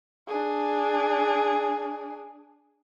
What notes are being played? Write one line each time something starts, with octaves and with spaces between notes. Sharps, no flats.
D4 G#4